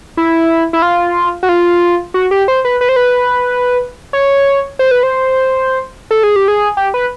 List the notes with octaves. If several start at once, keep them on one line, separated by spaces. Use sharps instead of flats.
E4
E4
F4
F#4
F4
F#4
G4
C5
B4
B4
C5
B4
C#5
C5
B4
C5
A4
G#4
G4
G#4
G4
B4